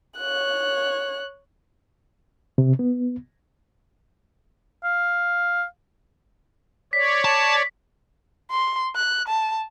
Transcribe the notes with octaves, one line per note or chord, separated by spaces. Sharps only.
C#5 F#6
C3
B3
F5
C#5 D5 B6
A5
C6
F#6
A5